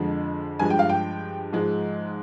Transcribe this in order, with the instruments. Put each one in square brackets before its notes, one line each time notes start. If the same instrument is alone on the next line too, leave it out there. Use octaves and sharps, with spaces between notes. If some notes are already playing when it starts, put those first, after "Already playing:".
Already playing: [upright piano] F2 D3 F3 G#3
G2 F3 G#3 G#5
G5
F5
G5
G#2 F3 G#3